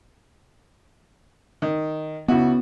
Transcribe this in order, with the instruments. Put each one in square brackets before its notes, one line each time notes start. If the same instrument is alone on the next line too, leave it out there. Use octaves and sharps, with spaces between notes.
[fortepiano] D#3
[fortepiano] C#2 E4 F#4 [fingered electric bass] B3